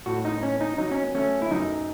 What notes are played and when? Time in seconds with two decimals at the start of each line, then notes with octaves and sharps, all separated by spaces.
0.06 A2 F#4
0.25 D#4
0.43 C#4
0.61 D#4
0.78 F#3 D#4
0.91 C#4
1.15 A3 C#4
1.42 E4
1.51 F#2 D#4